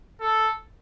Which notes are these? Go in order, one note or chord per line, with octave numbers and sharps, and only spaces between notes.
A4